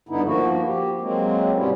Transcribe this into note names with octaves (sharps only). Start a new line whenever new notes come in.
G2 D3 B3 D#4 E4
F3 A#3 F#4
G4
F#3 G#3 A#3 C4
G#2 C3 G3 B3 C#4 E4